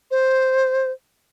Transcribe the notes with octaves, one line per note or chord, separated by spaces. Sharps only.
C5